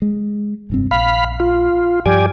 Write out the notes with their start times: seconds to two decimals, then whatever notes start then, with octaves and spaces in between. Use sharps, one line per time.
0.02 G#3
0.70 F1 G2 C4
0.91 A#1 F5 B5
1.40 F4
2.06 G2 F3 G4 D5 G#5